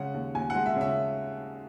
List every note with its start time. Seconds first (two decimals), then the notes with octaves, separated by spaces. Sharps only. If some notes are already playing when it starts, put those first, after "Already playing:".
Already playing: C#3 G#3 F#5
0.14 D#2
0.34 D#2 G#5
0.50 G#3 F#5
0.66 E5
0.76 C#3 E5